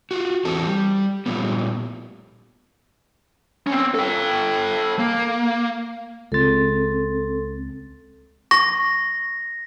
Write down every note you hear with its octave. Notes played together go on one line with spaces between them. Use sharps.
F4 F#4
E2 E3 C4 A4
G3
A#2 F3 G3 A3 B3
C4 C#4
A4 G5
A#3
C#2 C4 A4 A6
C#6 A#6